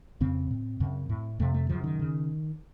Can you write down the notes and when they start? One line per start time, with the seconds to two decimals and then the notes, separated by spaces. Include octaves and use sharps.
0.21 F2 C#3 C4
0.51 A2
0.80 F#2 C#3
1.09 A2
1.39 F2 C3 A3
1.54 A3
1.69 F#2 C#3 F3
1.84 D#3
1.99 C#3